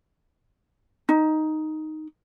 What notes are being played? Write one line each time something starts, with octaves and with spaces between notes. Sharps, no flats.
D#4